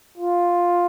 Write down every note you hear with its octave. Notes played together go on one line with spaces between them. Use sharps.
F4